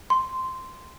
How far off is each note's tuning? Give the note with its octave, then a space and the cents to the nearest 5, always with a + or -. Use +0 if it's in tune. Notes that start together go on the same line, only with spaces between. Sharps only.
C6 -10